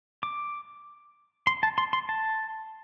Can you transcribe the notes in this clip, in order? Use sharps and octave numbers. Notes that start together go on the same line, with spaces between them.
D6
C6
A5
C6
C6
A5